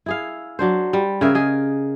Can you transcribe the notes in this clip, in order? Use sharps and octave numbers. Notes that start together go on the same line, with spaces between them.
E4 G#4 F5
F#3 D4 C5
G3
C#3 G#4 A#4 E5
G#4 D#5